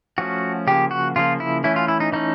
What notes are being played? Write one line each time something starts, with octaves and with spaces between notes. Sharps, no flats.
F3 A3 C#4 F#4
C#3 F3 A#3 G4
F#4
C#3 F3 A#3 F4
E4
E3 A3 C#4 E4
F4
E4
D#4
E3 A3 C#4 D#4